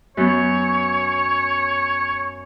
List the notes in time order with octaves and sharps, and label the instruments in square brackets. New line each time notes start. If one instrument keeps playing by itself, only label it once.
[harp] F#2 B3 [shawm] C#5